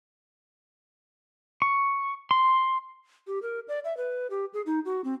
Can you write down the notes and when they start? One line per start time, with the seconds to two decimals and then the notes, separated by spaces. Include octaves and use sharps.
1.62 C#6
2.31 C6
3.27 G4
3.42 A#4
3.68 D5
3.85 E5
3.97 B4
4.30 G4
4.54 G#4
4.66 D#4
4.86 F#4
5.04 C4